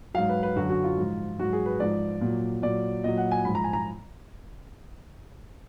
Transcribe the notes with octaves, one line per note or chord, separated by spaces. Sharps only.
G#2 F#3 F5
B4
B4
F#2 D3 F#3 F#4
F#4
F4
G#2 F3
G#2 F#3 F#4
G#4
B4
G#2 F3 D5
A#2 F#3
A#2 F#3 D5
A#2 F#3 D#5
F#5
G#5
G#2 F3 B5
A#5
G#5
A#5